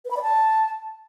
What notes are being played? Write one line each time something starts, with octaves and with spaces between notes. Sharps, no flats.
B4
B5
D5
A5